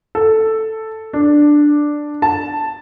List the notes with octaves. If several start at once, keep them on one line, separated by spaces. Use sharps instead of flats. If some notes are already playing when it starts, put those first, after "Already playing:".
A4
D4
A5